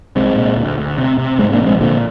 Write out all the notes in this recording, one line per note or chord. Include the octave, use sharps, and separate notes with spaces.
C2 G#3 C4
A#2
D2
D2
C3
C3
G#2 G#3 C4
A#3 D4
A#1
G#3 C4
A#2 D3 F3